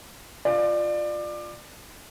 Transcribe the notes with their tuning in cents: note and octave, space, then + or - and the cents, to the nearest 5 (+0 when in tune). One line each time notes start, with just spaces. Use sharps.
F4 +0 D5 +25